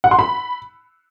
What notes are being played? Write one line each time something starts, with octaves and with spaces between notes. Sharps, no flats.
F#5
C6
B5